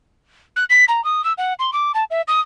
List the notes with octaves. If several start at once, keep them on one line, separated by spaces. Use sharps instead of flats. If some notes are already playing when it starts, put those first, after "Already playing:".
F#6
B6
A#5
D#6
E6
F#5
C6
D6
A5
E5
D#6